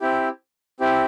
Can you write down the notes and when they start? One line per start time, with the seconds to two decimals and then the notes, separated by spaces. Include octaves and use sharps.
0.01 C4 E4 G4
0.80 C4 E4 G4